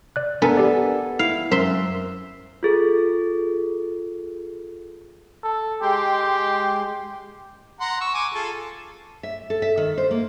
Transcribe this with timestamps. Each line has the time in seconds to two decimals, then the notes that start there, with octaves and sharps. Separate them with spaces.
0.16 D5 F#6
0.42 B3 D4 A4 A#4 G#5 A#5
0.57 G4 D5
1.19 E4 F5
1.51 F#2 A#4 C5 E5 C6
2.63 F4 G#4 A4
5.43 A4
5.82 G#3 G4 G5 C6
7.81 F#5 A#5 C6
8.01 C#6 E6
8.14 G#5 C#6 D6
8.34 F4 G#4 A4
9.23 E5
9.50 A4
9.62 E5
9.77 D#3
9.98 C5
10.11 A#3